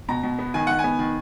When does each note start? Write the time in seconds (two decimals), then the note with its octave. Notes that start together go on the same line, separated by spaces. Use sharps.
0.09 B2 A#5
0.23 B2
0.38 B3
0.54 D#3 G#5
0.67 D#3 F#5
0.79 G#5
0.84 B3
0.99 D#3